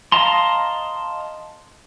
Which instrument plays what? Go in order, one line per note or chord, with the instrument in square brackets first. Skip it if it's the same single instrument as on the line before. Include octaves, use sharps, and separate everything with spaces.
[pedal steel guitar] D#5 F5 A5 A#5 C6